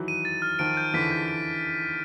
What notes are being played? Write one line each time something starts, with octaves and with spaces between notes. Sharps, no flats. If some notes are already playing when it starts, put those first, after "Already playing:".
Already playing: D#3 E3 F#3
D#7
A6
F6
D#3 F3 D7
G6
D3 E3 B6
G6
D7